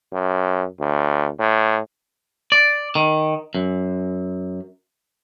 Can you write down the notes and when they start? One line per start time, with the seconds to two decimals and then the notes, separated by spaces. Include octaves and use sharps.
0.12 F#2
0.80 D2
1.39 A2
2.52 D5
2.95 D#3
3.55 F#2